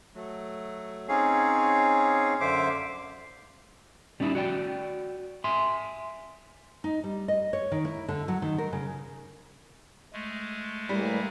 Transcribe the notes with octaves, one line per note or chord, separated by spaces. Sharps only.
F#3 A3
C4 C#4 D#4 G#4 C#5 F5
F#2 D3 C5 E5 F5 D6
G3 C#4 D#4 E4
F#4 D5 G5
E5 G#5 C6
D#4
G3
D#5
C#5
D#3
E4
D3
F#3
D#3
A#4
C#3
G#3 A3
A2 E3 G3 A#3